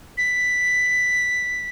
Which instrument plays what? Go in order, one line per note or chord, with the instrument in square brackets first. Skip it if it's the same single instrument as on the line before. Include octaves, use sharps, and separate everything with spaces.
[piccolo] B6